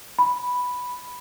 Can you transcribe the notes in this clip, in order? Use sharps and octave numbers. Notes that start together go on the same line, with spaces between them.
B5